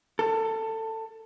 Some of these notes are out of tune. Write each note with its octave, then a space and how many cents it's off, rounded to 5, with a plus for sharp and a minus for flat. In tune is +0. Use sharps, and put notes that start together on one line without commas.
A4 +20